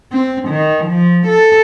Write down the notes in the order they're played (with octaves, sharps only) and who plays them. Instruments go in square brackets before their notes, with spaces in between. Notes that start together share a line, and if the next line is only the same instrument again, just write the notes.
[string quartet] C4
D#3
F3
A4